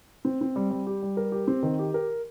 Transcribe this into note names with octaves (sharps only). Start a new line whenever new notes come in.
C4
C4
G3
G3
G4
G3
A#4
G4
C4
D#3
G4
A#4